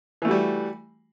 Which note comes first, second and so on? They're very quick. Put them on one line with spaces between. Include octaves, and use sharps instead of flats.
E3 A3 F#4 G3